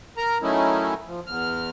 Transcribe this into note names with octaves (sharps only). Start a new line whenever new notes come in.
A#4 A#5
D#3 F#3 A3 C#4 D#4 E4
F3
E2 F6